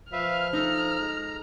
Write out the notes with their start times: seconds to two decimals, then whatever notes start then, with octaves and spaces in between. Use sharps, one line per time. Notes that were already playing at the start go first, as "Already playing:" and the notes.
0.12 F3 B4 E5 F5 F6
0.53 D#4 A4 A#5
1.00 G#3